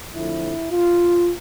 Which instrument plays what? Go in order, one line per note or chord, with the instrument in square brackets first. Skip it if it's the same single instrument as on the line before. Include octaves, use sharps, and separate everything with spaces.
[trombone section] F2 D3 F3 A3 E4
F4